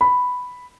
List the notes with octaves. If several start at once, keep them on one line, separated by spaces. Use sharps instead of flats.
B5